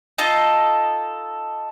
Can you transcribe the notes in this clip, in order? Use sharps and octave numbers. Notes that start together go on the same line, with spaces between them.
D#4 F4 A4 D#5